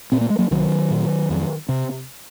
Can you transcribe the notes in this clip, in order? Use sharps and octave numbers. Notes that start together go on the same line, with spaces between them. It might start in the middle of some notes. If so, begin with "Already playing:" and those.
A#2 C4
A#3
G#3
F#3 A#3
C2 D#3 F#3
A#2
F2
C3